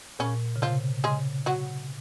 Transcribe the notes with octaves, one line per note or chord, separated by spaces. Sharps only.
A#2 C#3 C#4
C#3
C3 F3 F4
C#3 G#3 G#4
F#3 F#4